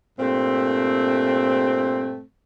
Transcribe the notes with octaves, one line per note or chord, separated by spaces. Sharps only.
G2 A#2 A3 C4